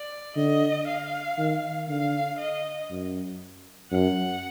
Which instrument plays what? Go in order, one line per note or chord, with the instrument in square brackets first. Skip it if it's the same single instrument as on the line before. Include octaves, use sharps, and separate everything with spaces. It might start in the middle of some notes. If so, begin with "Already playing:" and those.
Already playing: [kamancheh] D5
[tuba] D3 [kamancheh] D#5
[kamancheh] F5
[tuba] D#3
[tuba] D3 [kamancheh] F5
[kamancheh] D#5
[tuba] F#2
[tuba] F#2 [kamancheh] F#5